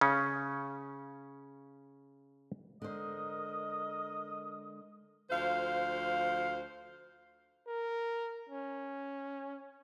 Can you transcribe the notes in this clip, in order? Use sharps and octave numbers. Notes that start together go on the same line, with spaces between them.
C#3 C#4
D3 G#3 A#4 C5 D#5 D#6
D2 F3 C5 F5
A#4
C#4